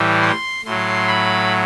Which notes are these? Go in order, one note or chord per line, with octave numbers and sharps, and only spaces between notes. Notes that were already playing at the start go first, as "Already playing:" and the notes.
Already playing: A2 E3 G3
C6
A2 F#3 C6
B5